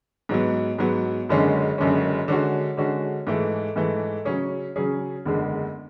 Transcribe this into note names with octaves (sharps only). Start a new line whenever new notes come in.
G#2 F#3 B3
G#2 F#3 B3
F#1 F#2 D3 G#3 C#4
F#1 F#2 D3 G#3 C#4
D3 G#3 C#4 F#4
D3 G#3 C#4 F#4
G#2 E3 A3
G#2 E3 A3
C#3 F#3 C#4 G#4
C#3 F#3 C#4 G#4
F#1 E2 D3 G#3